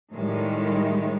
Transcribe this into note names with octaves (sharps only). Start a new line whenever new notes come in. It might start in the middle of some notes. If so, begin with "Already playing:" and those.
A2 D#3 G3 G#3